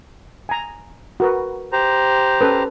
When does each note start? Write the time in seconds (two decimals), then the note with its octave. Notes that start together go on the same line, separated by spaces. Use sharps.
0.49 G#5 A#5
1.20 F#4 A#4 B4
1.73 G4 C5 A#5
2.41 C#4 A4 B4